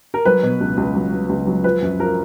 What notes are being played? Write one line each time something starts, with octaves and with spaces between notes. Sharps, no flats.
A#4
F#3 B4
B2
C#2
C#2
F#3
F#3
C#2
F#3
F3 B4
F#2
F3 A#4